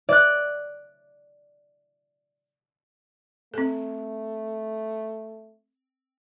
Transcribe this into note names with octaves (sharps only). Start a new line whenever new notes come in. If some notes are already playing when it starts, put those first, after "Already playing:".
D5 F#6
A3 C4 A4